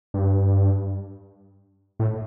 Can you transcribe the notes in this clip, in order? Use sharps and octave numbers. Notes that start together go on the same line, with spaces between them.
G2
A2